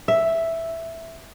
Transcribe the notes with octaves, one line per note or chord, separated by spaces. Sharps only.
E5